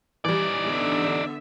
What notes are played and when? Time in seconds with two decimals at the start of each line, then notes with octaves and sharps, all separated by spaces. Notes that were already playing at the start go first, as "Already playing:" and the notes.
0.25 E3 G3 D#4 D5
0.64 D3 B3 E5